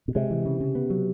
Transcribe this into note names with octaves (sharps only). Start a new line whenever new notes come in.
B2
C3 G#3
E3
C#3
C#3
B3
F#3